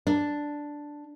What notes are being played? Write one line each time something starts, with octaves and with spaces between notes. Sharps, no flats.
D4